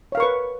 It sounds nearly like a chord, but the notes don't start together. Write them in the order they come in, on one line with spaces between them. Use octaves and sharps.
C#5 F5 A#4 C#6 B4